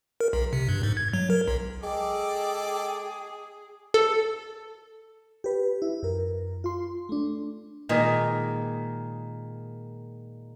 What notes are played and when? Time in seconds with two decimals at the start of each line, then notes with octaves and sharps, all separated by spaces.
0.21 A#4
0.33 B1
0.53 C3
0.68 G2
0.83 G#2
0.97 G#6
1.14 F#3
1.30 A#4
1.48 B1
1.83 G#3 G#4 A4 D5 G5 D6
3.94 A4
5.44 G4 B4
5.82 E4
6.03 F#2 A#4
6.64 F4 C6
7.09 A3 D4
7.89 A#2 D#3 G#3 D#5